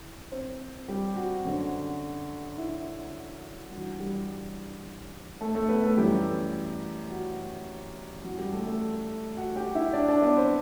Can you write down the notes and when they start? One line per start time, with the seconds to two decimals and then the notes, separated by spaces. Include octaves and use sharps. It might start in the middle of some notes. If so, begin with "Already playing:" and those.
Already playing: E3
0.32 C4 C5
0.88 G3 G4
1.16 F#4
1.45 F#2 D3
2.58 E4
3.72 G2 E3 F#4
3.99 G3 G4
5.41 A3 A4
5.55 A3 A4
5.69 B3 B4
5.83 A3 A4
5.97 F#2 E3 G3 G4
7.11 F#4
8.24 F#2 E3 F#4
8.38 G3 G4
8.52 A3 A4
8.66 A3 A4
9.37 F#4 F#5
9.56 G4 G5
9.75 E4 E5
9.93 D4 D5
10.08 D4 D5
10.21 B3 B4
10.36 C4 C5